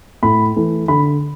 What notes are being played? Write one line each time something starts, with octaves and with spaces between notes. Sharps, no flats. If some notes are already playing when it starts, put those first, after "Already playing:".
A2 B5
E3 A3
D3 B5